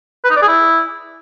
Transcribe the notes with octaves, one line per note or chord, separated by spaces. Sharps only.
B4
D#4
D5
G#4
E4